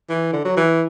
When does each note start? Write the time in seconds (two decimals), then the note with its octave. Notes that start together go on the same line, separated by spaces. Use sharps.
0.10 E3
0.33 D3
0.45 F#3
0.57 E3